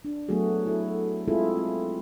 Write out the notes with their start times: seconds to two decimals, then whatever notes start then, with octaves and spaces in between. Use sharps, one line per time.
0.05 D4
0.29 F#3 A3 B3 F#4 G#4
0.66 E4 A4
1.28 G#3 C4 E4 F4 G#4 A4
1.57 C4